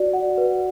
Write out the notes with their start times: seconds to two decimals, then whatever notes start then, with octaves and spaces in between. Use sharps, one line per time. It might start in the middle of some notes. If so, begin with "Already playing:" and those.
Already playing: F#4 D5
0.13 F#5
0.38 B4